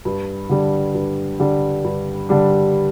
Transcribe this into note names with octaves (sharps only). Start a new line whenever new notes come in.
G2
D3 G3 D4
G2
D3 G3 D4
G2
D3 G3 D4